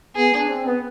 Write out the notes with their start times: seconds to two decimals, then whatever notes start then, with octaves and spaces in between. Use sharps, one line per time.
0.16 B3 G#4
0.33 D4
0.49 C4
0.65 B3